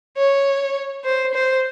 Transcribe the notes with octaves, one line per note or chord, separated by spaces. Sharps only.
C#5
C5
C5